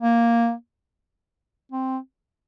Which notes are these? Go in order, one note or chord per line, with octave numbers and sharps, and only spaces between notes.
A#3
C4